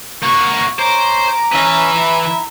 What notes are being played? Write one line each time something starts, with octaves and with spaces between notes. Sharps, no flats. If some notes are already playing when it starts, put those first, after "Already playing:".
A#3 F#4 C#6
C5 C#5 A#5 D6
E3 C#4 B4 E5
E4